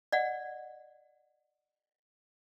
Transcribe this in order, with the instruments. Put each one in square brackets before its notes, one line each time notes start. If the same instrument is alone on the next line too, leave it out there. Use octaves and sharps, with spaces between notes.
[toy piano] D5 D#5 F#5